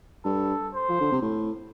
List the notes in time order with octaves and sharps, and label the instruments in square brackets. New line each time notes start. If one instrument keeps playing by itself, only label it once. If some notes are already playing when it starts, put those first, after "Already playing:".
[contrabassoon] G2 [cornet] A4
[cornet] C5
[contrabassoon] F3
D3
C3
A2